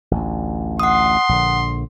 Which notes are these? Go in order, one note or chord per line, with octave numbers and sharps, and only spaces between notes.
A1 D2
F#5 C6 D#6
A#1 D3